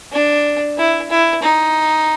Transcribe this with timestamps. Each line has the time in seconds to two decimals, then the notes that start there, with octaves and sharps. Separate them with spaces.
0.12 D4
0.78 E4
1.10 E4
1.43 D#4